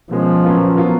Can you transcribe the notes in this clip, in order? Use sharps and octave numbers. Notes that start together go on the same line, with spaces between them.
B2 F3 G#3 C#4
A#2 F#3 C#4 F4 B4
F#3 B3 F4 A#4